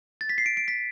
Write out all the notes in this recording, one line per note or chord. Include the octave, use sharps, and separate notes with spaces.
A6
B6
C7
D7
D7
B6